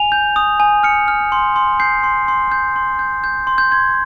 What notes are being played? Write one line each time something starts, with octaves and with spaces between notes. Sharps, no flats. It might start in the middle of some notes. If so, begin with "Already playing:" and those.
Already playing: G#5 F7
G6
D#6
G#5
F6 C#7
F6
C6
C6
G6 C7
C6
C6
G6
C6
G6
G6
C6
G6
C6 G#6